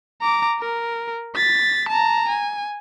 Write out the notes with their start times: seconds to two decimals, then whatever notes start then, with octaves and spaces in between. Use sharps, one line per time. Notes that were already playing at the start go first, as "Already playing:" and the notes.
0.21 A#5 D6
0.60 A#4
1.36 A6 B6
1.89 A5 A#5
2.29 G#5